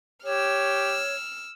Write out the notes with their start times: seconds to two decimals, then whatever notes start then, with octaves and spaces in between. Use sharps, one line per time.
0.24 G4 C#5 E6 F6